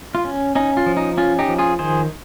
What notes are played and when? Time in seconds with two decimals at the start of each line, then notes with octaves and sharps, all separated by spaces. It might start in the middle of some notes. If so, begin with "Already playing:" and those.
0.15 F4
0.25 C#4
0.55 C#4 D#4
0.77 F4
0.86 F3
0.97 D#4
1.17 C#4 F4
1.39 D#4 G4
1.49 F3
1.58 F4 G#4
1.79 D#3 G#4 C5